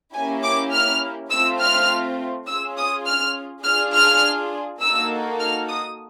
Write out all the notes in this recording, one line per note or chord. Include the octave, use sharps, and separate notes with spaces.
A#3 C#4 E4 G4 G#5
D6
F6
A3 C4 F4 E6
F6
C#4 F4 G#4 E6
D#6
F6
D4 F4 G#4 F6
F6
A#3 D#4 F#4 A4 E6
F6
D#6